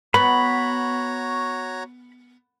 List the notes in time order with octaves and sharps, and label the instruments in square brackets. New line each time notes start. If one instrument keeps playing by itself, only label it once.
[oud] B3 [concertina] F#4 C#5 A#5 [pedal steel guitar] B5